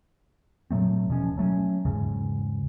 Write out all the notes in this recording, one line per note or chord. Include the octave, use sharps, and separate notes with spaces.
A#2 F#3 A3 C4
E1 B2 F3 C#4
F#3 A3 B3 C#4
E2 G#2 C#3